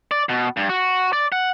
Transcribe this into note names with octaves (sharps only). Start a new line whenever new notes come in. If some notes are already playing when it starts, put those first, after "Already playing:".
D5
B2
G2
F#4
D5
F#5